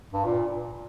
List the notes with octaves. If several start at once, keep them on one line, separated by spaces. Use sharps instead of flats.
G2
A#2